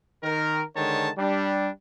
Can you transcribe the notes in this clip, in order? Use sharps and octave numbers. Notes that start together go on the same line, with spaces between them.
D#3 A#4
D3 D#3 G#3 C#5 A5
G3 D4